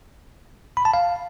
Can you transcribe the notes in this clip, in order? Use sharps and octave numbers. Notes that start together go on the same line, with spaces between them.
B5
A5
F5